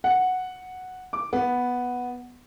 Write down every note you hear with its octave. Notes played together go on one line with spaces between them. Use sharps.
F#5
D6
B3